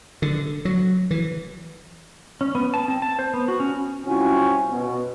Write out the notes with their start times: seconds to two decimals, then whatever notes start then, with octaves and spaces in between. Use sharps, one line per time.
0.22 D3
0.65 F#3
1.11 E3
2.41 C#4
2.55 B3
2.74 A5
2.88 C4
3.02 A5
3.19 C5
3.34 B3
3.48 F#4
3.60 C#4
4.05 C2 C4 C#4 F4 F#4 G#5
4.70 B2